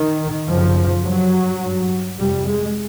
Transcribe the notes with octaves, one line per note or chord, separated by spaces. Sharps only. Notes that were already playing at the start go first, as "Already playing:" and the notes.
Already playing: D#3
F#2 C#3 F3
G2 F#3
G2
F2 C3 G3
G#3